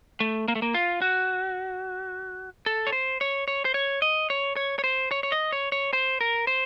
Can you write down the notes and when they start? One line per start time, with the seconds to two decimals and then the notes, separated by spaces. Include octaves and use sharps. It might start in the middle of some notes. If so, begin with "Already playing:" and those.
0.20 A3
0.48 A#3
0.55 A3
0.62 A#3
0.74 F4
1.02 F#4
2.66 A4
2.87 C#5
2.92 C5
3.21 C#5
3.48 C#5
3.65 C5
3.74 C#5
4.02 D#5
4.30 C#5
4.56 C#5
4.79 C#5
4.84 C5
5.11 C#5
5.23 C#5
5.32 D#5
5.52 C#5
5.72 C#5
5.93 C5
6.21 A#4
6.47 C5